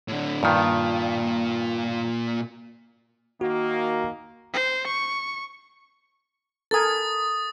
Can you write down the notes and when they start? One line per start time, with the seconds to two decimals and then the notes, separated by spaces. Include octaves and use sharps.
0.08 A2 D3
0.43 G2 A#2 D#3 F4
3.41 D#3 A#3 F#4
4.54 C5
4.87 C#6
6.71 A4 A#4 G#5 D#6 A6